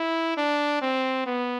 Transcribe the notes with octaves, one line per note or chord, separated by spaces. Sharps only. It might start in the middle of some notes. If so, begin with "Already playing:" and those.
Already playing: E4
D4
C4
B3